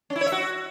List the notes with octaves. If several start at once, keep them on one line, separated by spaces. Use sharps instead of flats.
C#4
E4
C#5
E5
F#4